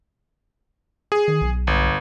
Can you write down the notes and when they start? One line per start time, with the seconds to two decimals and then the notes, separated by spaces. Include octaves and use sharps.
1.12 G#4
1.28 D#3
1.42 B1
1.67 G1